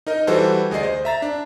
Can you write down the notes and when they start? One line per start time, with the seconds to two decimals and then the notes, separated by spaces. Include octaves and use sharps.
0.07 D#4 A#4 D#5
0.27 E3 G3 F#4 A4 B4 C5
0.71 D2 G#4 D5 D#5 C7
0.83 C5
1.05 E5 A#5 A6
1.22 D4